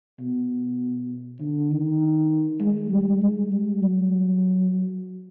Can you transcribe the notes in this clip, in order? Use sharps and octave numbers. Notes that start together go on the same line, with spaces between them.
B2
D3
D#3
G#3
G3
G#3
G3
F#3